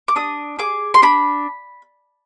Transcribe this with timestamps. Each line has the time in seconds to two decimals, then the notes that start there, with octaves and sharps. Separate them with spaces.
0.08 D6
0.16 D4 D#6
0.59 G#4 D6
0.94 C6
1.02 D4 B5